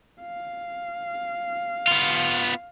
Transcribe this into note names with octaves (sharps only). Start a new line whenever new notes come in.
F5
B3 F4